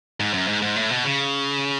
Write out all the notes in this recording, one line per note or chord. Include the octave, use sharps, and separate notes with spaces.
G#2
F#2
G#2
G#2
A2
B2
C#3